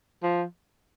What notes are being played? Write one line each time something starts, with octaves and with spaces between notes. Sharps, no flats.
F3